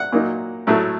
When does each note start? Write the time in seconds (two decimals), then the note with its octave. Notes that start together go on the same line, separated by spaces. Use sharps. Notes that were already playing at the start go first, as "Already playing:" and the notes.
Already playing: F#5
0.12 A#2 F#3 A#3 D#4
0.67 A2 F#3 A3